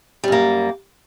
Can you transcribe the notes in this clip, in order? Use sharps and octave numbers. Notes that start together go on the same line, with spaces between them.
F#2 G3 A#3